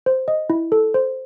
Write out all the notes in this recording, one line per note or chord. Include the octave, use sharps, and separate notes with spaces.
C5
D#5
E4
A4
C5